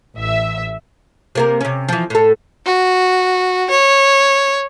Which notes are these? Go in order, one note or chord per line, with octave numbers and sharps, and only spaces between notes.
A1 E5
C3 A#3 A#4
C3 C#4
E3 F3
A2 A4
F#4
C#5